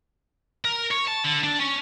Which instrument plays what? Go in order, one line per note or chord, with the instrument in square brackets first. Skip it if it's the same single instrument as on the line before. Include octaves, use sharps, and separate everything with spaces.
[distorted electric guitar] A#4
C#5
A5
D3
D4
C#4